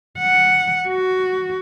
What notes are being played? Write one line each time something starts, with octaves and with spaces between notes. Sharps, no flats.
F#5
F#4